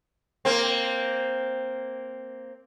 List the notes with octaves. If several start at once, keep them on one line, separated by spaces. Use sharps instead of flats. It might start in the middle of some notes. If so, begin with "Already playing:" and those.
A#3 C4